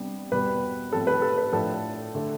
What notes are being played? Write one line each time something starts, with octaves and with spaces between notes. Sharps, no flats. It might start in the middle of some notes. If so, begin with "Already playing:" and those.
Already playing: C3 G3 B3 D4
E2 B2 G3 B4
A2 F3 C4 A4
B4
A4
B4
A2 F3 A3 D4 A4
D3 A3